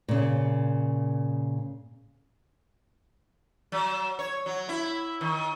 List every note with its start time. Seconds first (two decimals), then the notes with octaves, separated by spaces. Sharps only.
0.08 A#2 C#3
3.72 F#3
4.19 C#5
4.46 F#3
4.69 E4
5.21 D#3